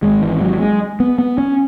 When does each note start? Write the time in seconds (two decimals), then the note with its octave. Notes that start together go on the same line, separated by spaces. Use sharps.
0.02 G#1 G#2 G#3
0.22 E3
0.41 F#3
0.60 G#3
1.00 B3
1.18 B3
1.38 C#4